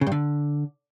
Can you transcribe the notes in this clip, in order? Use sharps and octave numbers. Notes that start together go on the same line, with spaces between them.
C#3
G2
D3